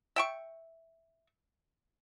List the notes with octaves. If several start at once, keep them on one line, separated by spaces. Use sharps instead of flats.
E5 G5 C#6